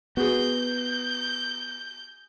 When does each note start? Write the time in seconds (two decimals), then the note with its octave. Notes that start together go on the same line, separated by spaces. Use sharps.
0.17 B3 F#4 G#4 G6